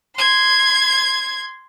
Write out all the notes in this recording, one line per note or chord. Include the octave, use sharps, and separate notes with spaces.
C6 G#6